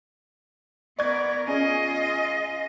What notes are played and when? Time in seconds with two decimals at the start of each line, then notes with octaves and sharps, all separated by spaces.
0.99 B3 A#4 D5 C#6 G#6
1.47 C#4 F4 G#4 D#5